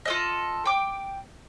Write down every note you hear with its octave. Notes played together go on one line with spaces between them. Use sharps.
F4 A4 D#5
G5 D6